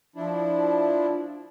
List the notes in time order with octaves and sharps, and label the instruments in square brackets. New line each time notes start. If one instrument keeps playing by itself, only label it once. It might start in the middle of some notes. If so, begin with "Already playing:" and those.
[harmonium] F3 D4 E4